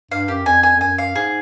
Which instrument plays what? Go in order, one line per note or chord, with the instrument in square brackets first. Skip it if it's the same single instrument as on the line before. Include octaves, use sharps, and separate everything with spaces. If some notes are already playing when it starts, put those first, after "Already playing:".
[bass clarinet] G2 [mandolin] F5
[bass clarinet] F#2 [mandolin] G4
[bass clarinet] F2 [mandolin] G#5
[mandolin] G#5
[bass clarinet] F2
[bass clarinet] F#2 [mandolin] G#5
[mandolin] F5
[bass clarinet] G#2 [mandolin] G#4